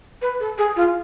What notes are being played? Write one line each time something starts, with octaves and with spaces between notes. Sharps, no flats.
B4
A4
G#4
F4